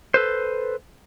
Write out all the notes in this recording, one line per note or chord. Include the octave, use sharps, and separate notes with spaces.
A4 B4 C5